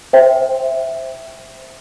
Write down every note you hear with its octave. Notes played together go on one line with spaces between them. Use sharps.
C5 E5 G5